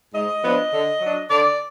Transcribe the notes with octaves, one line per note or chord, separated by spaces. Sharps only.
G#2 D#5
F3 B3 D4
D3
F#3 D4
D3 D5